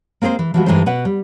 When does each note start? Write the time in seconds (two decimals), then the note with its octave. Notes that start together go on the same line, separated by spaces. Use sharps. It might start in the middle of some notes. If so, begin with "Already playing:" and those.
0.22 A#3 C4 G#4 A#4 C5
0.39 E3
0.54 E3 F3 G3 G#3 F#4
0.66 G2 E3 G#3 D#4 A4 C5
0.86 B2 B4 F#5
1.05 G3